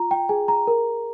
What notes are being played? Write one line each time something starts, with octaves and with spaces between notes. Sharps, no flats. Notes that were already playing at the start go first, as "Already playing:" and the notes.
Already playing: F4 A#5
G5
G#4 G#5
A#5
A#4